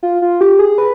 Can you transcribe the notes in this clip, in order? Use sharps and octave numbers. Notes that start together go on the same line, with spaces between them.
F4
F4
G4
G#4
B4